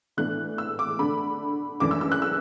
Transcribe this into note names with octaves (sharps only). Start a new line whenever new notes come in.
A2 E3 B3 D4 F#6
E6
D6
D3 A3 D4 B5
F#2 E3 A3 D4 D6
E6
E6
F#6
E6